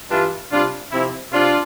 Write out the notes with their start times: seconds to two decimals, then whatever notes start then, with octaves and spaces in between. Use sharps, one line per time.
0.10 G2 E3 G3 D4 F4
0.51 C3 G3 D4 F4
0.92 C3 F3 C4 E4
1.32 C3 D4 F4